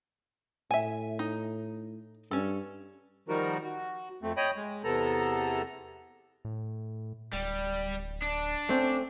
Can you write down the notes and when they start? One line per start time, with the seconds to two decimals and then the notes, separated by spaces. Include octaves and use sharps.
0.71 A2 E5 G#5
1.19 D#4
2.31 G2 C#4 A4
3.28 D#3 F3 G3 D#4 F#4 A#4
3.63 F#4
4.22 F2 A3 C4
4.37 C#5 D#5 G5 B5 D#6
4.56 G#3
4.84 E2 C3 B3 A4 A#5
6.45 A2
7.33 D1 G3
8.22 D4
8.69 A3 C4 C#4